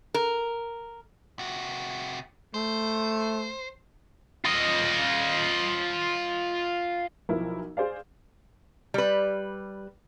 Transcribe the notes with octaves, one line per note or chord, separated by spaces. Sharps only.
A#4
C3 F#4
A3 C5
F4 D#5
B1 F3 E4 A#4
G#4 C5 D5 F5
G3 B4